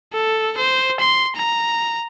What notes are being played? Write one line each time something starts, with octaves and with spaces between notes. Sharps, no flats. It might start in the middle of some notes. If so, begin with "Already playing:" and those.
A4
C5
C6
A#5